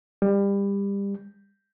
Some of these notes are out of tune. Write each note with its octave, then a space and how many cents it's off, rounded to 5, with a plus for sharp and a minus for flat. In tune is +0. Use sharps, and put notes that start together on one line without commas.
G3 +25